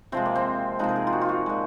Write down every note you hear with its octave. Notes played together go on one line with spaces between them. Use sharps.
C3 F3 G#3 C4
A#3
C4
C3 F3 G#3 D#4
A#4
G#4
F4
F#4
F4
F#4
A#2 G#3